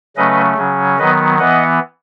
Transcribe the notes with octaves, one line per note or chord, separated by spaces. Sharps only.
C#3 F#3 A3 C#4 B4 D#5
C#3 F#3 C#4
D#3 F#3 B3 B4 D#5
E3 B3 D#5 F#5